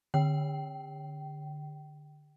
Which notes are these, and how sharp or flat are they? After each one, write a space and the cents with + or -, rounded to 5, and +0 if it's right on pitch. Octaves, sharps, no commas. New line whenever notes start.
D3 +15 G5 -20